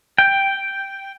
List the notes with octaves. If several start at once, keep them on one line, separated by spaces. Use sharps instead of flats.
G5